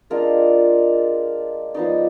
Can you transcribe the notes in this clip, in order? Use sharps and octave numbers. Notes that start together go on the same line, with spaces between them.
G#3 D4 F4 A#4
F3 B3 D#4 D5